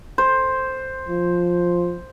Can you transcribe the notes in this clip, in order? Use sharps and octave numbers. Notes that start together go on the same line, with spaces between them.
C5
F3